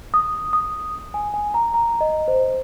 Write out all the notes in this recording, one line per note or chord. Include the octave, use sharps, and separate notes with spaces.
D#6
D#6
G#5
G#5
A#5
A#5
D#5
C5